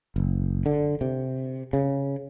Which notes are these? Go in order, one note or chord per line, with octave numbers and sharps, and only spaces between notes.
F#1
D3
C3
C#3